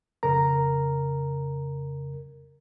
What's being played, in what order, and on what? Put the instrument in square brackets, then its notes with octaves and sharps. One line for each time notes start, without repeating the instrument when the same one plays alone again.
[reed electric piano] F2 C#3 A#4 A#5